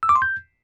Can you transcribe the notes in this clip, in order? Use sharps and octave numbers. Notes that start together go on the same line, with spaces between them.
E6
D6
C6
G6